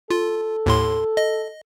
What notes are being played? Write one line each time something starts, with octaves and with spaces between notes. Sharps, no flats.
F4 A4
D#2 A2 C6
D#5